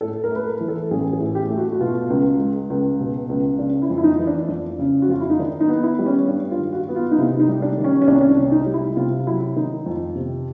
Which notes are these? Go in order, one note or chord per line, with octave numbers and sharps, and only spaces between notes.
A2 A4
A#4
A3 B4
A#4
E3
A4
A1 G#4
G#4
A2
G4
A3
F#4
F#4
B2 F4
C#2
G#3
C#2
B2
C#2
C#3 D4
E4
F2
E4
D#4
E3
D4
F2 D4
C#3
F#4
F2 F4
E4
D#4
D#3 D4
D#4
B3
E4
G3
C#4
G2 D4
F4
D#3
F#4
B3
F4
D#4
C3 E4
D#4
G3
D4
D#3
C#4
C#4
C2 D4
C#4
D4
C3
D#4
G3
E4
C3 F4
F#3 E4
D#3 D#4
F2
C3